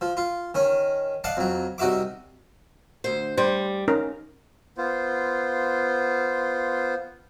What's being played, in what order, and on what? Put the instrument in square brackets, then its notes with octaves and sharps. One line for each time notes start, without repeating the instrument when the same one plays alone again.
[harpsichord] F3
F4
D#3 C#4
D5 D#5 F5 F#5 A5
F2 F#3
C2 D#4 F#4 E5 D6
[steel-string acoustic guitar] D2 C5
[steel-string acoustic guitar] G3 [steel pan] C5
[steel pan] C#4 D#4 A#4
[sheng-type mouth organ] B3 F4 C5